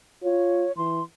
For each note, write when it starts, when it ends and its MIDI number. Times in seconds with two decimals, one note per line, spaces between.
0.23 0.67 65
0.23 0.72 73
0.77 1.00 52
0.77 1.03 84